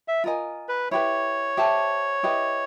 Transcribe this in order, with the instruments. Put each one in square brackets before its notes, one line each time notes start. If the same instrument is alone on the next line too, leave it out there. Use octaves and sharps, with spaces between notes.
[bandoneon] E5
[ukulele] F4 A#4 D#5 G#5
[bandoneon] B4
[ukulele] E4 G4 B4 [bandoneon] C#5
[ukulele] G4 C5 E5 A5
E4 G4 B4 D#5